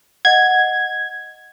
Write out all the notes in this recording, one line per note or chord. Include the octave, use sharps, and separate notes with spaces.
D#5 F#5 G#6